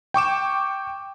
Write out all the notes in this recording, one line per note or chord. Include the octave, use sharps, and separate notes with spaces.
G5 C#6 D6 E7